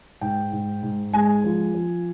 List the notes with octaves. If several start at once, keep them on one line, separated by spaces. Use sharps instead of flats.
G#2 G5
G#2
G#2
G#3 G#5
F3
F3